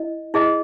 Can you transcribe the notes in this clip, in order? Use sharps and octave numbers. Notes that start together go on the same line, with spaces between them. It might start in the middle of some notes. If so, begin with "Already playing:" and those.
Already playing: E4 D#5
E4 G#4 D#5